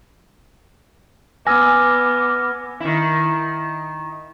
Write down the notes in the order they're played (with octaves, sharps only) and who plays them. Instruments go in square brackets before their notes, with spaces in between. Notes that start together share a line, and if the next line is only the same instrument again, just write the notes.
[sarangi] B3 [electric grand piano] G#5 [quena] D6 [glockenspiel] E6 F6 A#6
[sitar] D#3 E4